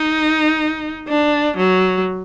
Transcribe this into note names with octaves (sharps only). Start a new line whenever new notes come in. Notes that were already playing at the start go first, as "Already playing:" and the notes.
Already playing: D#4
D4
F#3